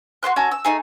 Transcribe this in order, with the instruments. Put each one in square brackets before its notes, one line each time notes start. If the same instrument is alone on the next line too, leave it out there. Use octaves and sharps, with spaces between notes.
[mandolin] F#4 B4 C6 F#6
C#4 F#4 A4 A#5
E6
A3 D#4 G#4